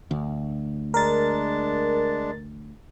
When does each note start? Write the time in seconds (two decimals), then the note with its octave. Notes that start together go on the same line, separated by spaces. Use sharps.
0.11 D2
0.94 G#3 D4 A#4 A6